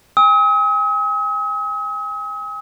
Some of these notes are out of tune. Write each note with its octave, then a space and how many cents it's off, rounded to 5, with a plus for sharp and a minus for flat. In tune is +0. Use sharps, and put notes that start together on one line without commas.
G#5 -40 D#6 +45